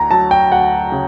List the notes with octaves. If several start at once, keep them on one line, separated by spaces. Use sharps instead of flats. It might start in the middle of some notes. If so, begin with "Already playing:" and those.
Already playing: D2 A#5
F#3 A5
G5
D2 F#5
C#3